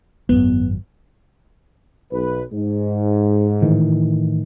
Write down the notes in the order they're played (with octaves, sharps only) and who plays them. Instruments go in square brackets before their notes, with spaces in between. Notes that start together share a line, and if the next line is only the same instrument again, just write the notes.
[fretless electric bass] G#1 F#2 [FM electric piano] B3
[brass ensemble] B1 B4
G#2
[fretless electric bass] A2 D#3 E3